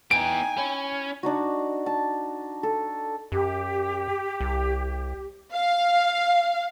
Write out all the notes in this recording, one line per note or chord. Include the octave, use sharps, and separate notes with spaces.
B3 D#4 E4 G5 G#5 D7
C#4 E4
D4 D#4 F#4
A5
A4
F#2 G4
C2
F5